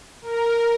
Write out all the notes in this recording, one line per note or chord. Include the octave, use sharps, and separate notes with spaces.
A#4